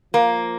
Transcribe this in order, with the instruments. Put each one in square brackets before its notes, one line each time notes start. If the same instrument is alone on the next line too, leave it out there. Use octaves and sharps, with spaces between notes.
[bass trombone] F3 [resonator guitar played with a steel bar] A#3